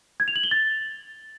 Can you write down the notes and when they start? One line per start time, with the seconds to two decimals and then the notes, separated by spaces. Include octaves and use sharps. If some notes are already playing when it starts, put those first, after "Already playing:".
0.20 G#6
0.28 F7
0.36 F#7
0.44 G7
0.51 A6